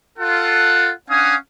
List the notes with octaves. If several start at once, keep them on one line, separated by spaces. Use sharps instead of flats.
F4 A4 F#5
C#4 D4 F5 F#5 G#5 D#6